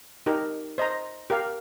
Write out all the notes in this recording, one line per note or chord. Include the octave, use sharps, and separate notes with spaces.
D#4 G4 A#4
C5 D#5 A#5
G4 A#4 F5